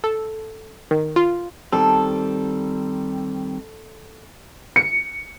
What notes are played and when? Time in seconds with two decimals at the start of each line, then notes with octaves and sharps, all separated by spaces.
0.04 A4
0.91 D#3
1.16 F4
1.73 D#3 G3 C4 A4
4.76 C#7